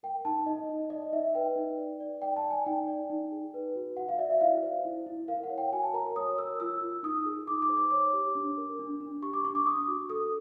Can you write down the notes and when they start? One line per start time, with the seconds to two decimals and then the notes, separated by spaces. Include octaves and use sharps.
0.03 A#4 G5
0.25 D#4 A5
0.46 D#4 D#5
0.69 D#4
0.90 D5 D#5
1.13 D#4 E5
1.35 B4 G5
1.56 D#4
1.78 D5
2.00 D5
2.22 D5 G5
2.36 A5
2.44 D5
2.51 G#5
2.66 D#4 G5
2.88 D5
3.10 D#4
3.32 G#4
3.54 B4
3.76 F#4
3.97 F#4 F#5
4.09 F5
4.18 D5 E5
4.30 E5
4.41 E4 F5
4.63 C5
4.85 E4
5.06 E4
5.28 A#4 F5
5.43 F#5
5.50 C#5
5.58 G5
5.72 F#4 G#5
5.83 A5
5.94 A#4 A#5
6.16 C#5 D#6
6.38 A#4 E6
6.60 F4 E6
6.81 F4
7.03 D#4 D#6
7.26 G#4
7.47 D#4 D6
7.62 D6
7.69 C5
7.77 D6
7.91 C#5 D6
8.13 G4
8.35 D4
8.57 A#4
8.79 D4
9.00 D4
9.22 G4 C#6
9.33 D6
9.45 D4 C#6
9.55 D6
9.67 D4 D#6
9.88 F#4
10.10 A4 D#6